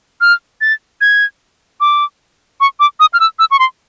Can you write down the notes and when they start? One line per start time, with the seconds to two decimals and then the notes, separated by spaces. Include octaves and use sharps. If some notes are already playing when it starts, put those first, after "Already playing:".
0.21 F6
0.61 A6
1.01 G#6
1.80 D6
2.61 C#6
2.80 D6
3.00 D#6
3.13 F6
3.20 E6
3.39 E6
3.51 C#6
3.59 C6